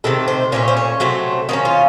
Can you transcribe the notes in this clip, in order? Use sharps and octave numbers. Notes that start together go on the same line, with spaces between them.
C3 D#3 A3 A4
C5
A#2 A3 C#4 C#5
C5
C#5
C3 F#3 A3 C5
D#3 A#3 C#4 D#4
F4